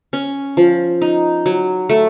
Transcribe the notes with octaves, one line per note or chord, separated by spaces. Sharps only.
C#4
F3
D#4
F#3
A3